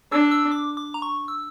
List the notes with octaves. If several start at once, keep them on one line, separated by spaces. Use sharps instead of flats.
D4 E6
E6
D6
D6
A#5
C#6
E6